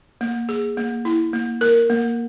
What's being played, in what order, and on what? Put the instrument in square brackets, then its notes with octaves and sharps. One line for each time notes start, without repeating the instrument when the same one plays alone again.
[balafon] A#3
G#4
A#3
E4
A#3
A#4
A#3